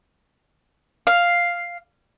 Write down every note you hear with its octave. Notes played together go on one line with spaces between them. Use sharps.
F5